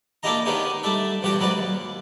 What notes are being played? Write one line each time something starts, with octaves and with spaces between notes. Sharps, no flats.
A#3 D4 E4 G4 D#5 A#5
D#3 B3 C#4 D#4 G4 G#4
G3 A3 D4 E5
E2 G2 F#4 G4 G5
G#2 F#3 G3 B4 D5
D#2